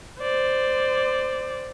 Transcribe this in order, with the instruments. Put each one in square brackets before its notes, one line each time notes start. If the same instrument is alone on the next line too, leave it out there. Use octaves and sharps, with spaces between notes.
[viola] C5 D5